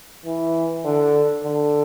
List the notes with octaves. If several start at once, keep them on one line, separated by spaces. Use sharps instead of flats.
E3
D3
D3